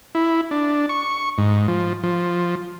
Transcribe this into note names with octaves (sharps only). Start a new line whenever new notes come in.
E4
D4
C#6
G#2
F3
F3